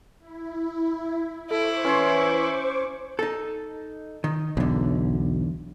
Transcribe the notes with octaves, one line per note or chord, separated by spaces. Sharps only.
E4
E4 A4 C5 C#6 D6
E3 C#4 C#5 C6
D#4 A4
D#3
B1 E2 D3